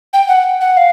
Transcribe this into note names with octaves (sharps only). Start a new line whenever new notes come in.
G5
F#5
F#5
F5